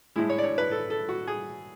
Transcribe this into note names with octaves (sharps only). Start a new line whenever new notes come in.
A2 G#3 E4
C#5
D5
C#5
B4
A4
A4
F#4
G#4